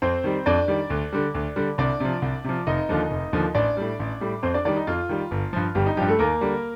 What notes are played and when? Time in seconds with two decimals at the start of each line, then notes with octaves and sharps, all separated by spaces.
0.02 F2 C4 C5
0.24 D#3 G3
0.46 F2 D4 D5
0.68 D#3 G3
0.90 D2
1.13 D3 G3
1.34 D2
1.56 D3 G3
1.78 C2 D4 D5
2.00 C3 F3
2.22 C2
2.44 C3 F3
2.67 F1 D#4 D#5
2.89 D#2 D3 F3
3.11 F1
3.33 D#2 D3 F3
3.54 A1 D4 D5
3.77 A2 G3
3.99 A1
4.21 A2 G3
4.43 F2 C4 C5
4.54 D4 D5
4.65 D#3 G3 D4 D5
4.76 D#4
4.87 F2 F4
5.09 D#3 G3
5.31 G1
5.53 G2 F3
5.75 G1 G3 G4
5.86 D#4
5.97 G2 F3 G3 G4
6.08 A3 A4
6.19 D#2 A#3 A#4
6.41 D3 G3